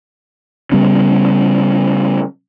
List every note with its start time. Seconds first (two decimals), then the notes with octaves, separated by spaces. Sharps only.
0.72 C#3 G3 B3 C#4